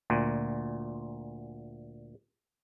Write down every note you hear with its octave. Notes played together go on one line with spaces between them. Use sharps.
D2 A#2